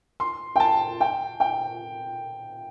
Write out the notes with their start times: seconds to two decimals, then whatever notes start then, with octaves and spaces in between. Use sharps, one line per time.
0.20 C6
0.56 G5
0.60 A5
1.01 G5
1.40 G5